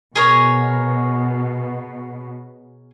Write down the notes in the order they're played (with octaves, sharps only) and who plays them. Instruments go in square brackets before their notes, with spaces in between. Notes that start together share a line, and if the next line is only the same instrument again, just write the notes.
[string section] B2 [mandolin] G#4 A#4 C#5